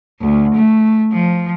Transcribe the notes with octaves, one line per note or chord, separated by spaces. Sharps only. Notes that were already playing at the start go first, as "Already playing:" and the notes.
D2
A3
F3